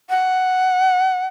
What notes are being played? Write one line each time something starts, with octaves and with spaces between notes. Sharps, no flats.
F#5